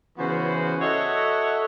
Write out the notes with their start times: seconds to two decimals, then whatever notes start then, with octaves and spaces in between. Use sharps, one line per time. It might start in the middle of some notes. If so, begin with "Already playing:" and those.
0.18 C#3 E3 B3 C#4 F#4 C5
0.82 F#4 A4 C#5 D#5 E5 F#5